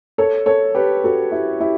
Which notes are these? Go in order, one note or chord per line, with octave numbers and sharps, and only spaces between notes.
A4 C#5
A4 C#5
G4 B4
F#4 A4
E4 G4
E4 G4